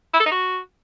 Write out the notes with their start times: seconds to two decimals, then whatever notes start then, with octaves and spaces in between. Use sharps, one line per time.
0.14 E4
0.20 A4
0.26 D#4
0.32 F#4